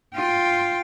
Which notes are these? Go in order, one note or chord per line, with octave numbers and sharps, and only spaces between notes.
F4 G5